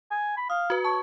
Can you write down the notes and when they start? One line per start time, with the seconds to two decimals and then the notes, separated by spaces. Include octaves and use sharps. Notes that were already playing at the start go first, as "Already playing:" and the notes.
0.11 G#5
0.37 B5
0.50 F5 D#6
0.70 F#4 B4
0.85 C#5 A5